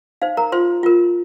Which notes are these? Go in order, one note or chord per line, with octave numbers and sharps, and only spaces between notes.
D#4 C5 F5
A#4 A#5
F4 C5 C6
F4 A#4